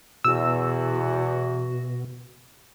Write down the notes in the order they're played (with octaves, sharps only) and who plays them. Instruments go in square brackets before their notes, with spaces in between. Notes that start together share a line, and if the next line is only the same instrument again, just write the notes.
[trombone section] E2 [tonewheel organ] B2 [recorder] F#4 [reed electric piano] E6